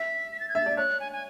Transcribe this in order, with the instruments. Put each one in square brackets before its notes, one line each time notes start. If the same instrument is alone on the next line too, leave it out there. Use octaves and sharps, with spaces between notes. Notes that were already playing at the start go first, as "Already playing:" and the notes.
Already playing: [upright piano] E5 [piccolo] B6
[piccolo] B6
A6
G#6
[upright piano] E5 [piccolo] A6
[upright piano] D5
[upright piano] C#5 [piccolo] F#6
[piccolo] G#5
G#5